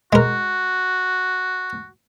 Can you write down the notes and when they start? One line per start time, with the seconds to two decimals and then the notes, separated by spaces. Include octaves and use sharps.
0.13 G#3 F#4 A#4